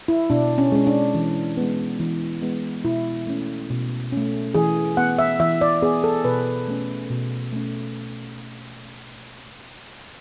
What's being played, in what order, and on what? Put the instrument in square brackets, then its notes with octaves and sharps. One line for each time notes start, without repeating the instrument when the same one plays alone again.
[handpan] E4
B2 D4
C#4
G#3 C#4
D4
E3
G#3 B3
E3
G#3 B3
B2 E4
A3 C#4
B2
A3 C#4
E3 G#4
B3 F#5
E5
E3 E5
D5
B3 G#4
A4
B2 B4
A3 C#4
B2
A3 C#4